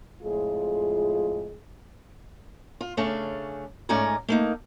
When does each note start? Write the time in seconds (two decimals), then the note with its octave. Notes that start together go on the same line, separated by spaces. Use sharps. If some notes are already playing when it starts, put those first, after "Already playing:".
0.22 F2 A2 G#3 F4 G#4
2.81 F4
2.97 C#3 A3 C#4 D4
3.89 G#2 A3 C#4 D5 G#5 A#5
4.28 A3 A#3 D#4